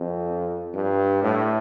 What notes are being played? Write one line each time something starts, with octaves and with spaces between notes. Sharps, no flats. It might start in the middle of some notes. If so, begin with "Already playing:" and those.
Already playing: F2
G2
A2